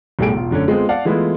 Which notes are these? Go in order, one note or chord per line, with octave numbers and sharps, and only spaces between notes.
B1 A2 G3 A3 G#4 D7
E1 F4
F#2 D3 A3 C#4
G#3 B3 C4 F4 A4
D5 F5 F#5 A5
E3 G#3 A3 B3 E4 F4